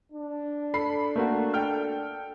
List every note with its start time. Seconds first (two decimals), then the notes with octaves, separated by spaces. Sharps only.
0.13 D4
0.74 A4 B5 C7
1.16 A3 A#3 F#4
1.54 A4 G5 F6